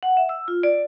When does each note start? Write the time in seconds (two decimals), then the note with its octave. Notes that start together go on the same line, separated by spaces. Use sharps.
0.03 F#5
0.17 E5
0.29 E6
0.48 F4
0.63 D5